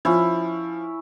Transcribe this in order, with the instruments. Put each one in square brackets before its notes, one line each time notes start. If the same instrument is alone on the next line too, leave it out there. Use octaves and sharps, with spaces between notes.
[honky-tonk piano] F3 [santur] C#4 E4